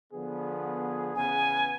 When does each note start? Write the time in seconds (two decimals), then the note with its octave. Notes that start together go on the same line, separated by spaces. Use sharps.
0.13 D3 F3 B3 G#4
1.16 E2 C#3 B3 G#5